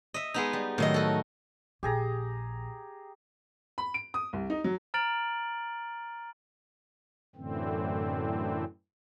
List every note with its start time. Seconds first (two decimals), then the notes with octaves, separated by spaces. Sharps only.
0.14 D#5 E5
0.34 G#3 B3 D#4
0.53 G3
0.78 A2 D#3 F#3 D#5
0.94 F#4 A4
1.83 A#1 G4 G#4 A#5
3.78 B5
3.94 D7
4.14 D#6
4.33 C2
4.50 D#4
4.64 F#3
4.94 A#5 F6 A6 D7 F#7
7.36 F#2 A2 D3 E3 C4